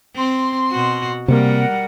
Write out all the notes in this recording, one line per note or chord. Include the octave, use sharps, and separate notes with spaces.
C4 C6
B2 F#4
C3 G3 A#3 A#4 F#5